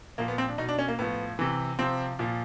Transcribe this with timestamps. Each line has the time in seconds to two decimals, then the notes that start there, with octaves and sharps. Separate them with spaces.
0.18 A#2 F3 A#3
0.28 B3
0.38 C4
0.48 D4
0.58 B2 D#4
0.69 D4
0.79 C#4
0.88 A#3
0.99 A2 F3 B3
1.39 C3 E3
1.79 C3 F3 C4
2.19 A#2 F3